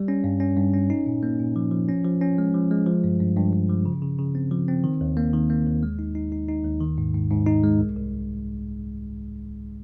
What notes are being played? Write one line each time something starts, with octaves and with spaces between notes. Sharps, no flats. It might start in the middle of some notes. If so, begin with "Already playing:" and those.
Already playing: G3
C#4
G2
C#4
G2
C#4
D#4
A#2
A#3
A#2
F3
F3
C#4
F3
C#4
G#3
F3
G#3
F3
G2
G2
G2
G2
F3
C#3
C#3
C#3
C4
F3
C4
D#3
D#2
A#3
D#3
A#3
D#2
G#3
D#4
D#4
D#4
D#4
D#2
D#3
G#2
G#2
G#2
D#4
G#3
C2
C2